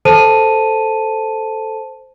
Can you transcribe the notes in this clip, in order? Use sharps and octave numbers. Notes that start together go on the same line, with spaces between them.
A4 C5 A5 D#7